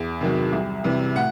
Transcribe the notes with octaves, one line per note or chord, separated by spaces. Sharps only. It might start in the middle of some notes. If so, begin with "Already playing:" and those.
Already playing: E2
C3 D#3 F#3
C2
C3 E3 G3
A2 F#5